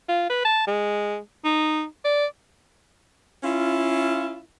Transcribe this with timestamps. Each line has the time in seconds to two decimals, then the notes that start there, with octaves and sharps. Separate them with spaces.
0.08 F4
0.30 B4
0.45 A5
0.67 G#3
1.44 D#4
2.04 D5
3.44 C#4 E4 F4